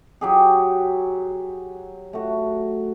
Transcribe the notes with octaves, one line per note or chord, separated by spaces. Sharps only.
F#3 G4 G#4
A3 F#4